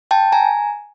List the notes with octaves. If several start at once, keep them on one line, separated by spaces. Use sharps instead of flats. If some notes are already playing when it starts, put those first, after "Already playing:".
G5 A5
G#5 A#5